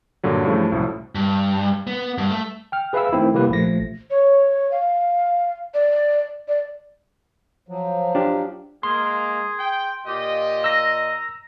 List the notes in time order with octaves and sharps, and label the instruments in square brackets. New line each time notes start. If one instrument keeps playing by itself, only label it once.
[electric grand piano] G2 A#2 D3 F#3
G2 C#3 E3 F3 A3
C2 F#2 A2 F3
[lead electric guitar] G2
B3
G2
A3
[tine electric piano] G5 F6
G#4 B4 E5 F5 B5 E6
D#3 A3 C4 E4
C3 G3 A#3 E4 G4 B4
A#1 F3 A3 A#6
[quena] C#5
F5
D5
D5
[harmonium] F3 F#3
[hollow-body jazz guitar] D4 F4 G4
[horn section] G#3 A#3 [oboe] G#4 [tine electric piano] C6
[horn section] G5
[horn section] A#2 F4 D#5 [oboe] G4
[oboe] A#5 [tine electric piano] E6 A#6